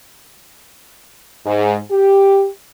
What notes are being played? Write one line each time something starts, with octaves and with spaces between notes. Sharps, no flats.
G#2
G4